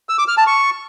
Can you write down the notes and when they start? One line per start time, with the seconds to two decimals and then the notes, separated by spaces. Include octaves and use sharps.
0.09 E6
0.18 D6
0.28 F6
0.37 A5
0.47 C#6